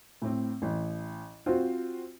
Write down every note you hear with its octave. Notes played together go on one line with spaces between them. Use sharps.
A2 C4
A1
C4 F4 F#4 C5